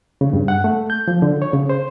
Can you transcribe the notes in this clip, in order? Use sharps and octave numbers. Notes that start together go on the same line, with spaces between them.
C#3
G2
F#5
A3
G6
F3
D3
C#5
C#3
C5